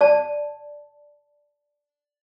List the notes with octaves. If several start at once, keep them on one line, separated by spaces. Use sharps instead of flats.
D5 A5